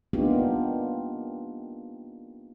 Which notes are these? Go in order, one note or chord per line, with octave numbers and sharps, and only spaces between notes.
A#3 B3 D4 D#4 F4 G4